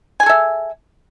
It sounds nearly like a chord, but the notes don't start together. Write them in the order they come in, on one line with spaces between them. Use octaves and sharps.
G#5 G#4 A4 E5